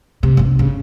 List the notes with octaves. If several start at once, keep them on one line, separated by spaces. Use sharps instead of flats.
C3
G1 C2
C#3